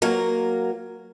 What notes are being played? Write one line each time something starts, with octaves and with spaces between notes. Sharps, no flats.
F#3 A#3 A#4